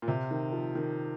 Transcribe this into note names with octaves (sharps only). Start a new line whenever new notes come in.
A#2
C3
D#3
F3
D#3